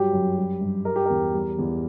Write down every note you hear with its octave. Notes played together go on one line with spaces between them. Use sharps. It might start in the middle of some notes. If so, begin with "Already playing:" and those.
Already playing: G2 F#3 G3 G4
F#2
G3
G2
G3 A#4
G4
E2 A#4
G3
E2